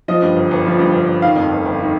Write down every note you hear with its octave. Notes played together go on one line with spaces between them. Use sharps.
F3 D#5
G2
G1
G1
F3
G2
G1
G1
D#3 F5
F2
G1
G1
D#3